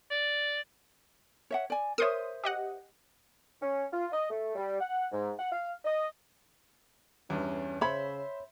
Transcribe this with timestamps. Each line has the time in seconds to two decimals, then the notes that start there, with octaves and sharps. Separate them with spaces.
0.11 D5
1.51 C#5 E5 F#5
1.70 D5 G#5
1.98 A#4 C5 C#5 E5 C6 D#6
2.44 G4 D#5 F#5
3.61 C#4
3.92 F4
4.11 D#5
4.30 A3
4.55 G3
4.80 F#5
5.11 G#2
5.38 F#5
5.52 F5
5.84 D#5
7.30 E2 G2 C#4
7.81 C#3 C5 C#5 E5 B5